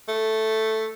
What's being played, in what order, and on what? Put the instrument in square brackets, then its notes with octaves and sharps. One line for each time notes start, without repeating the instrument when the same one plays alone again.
[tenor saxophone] A3